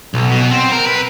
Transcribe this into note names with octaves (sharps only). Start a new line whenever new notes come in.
B1
B2
C4
A#4
B4